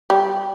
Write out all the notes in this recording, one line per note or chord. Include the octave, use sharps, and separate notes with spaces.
G3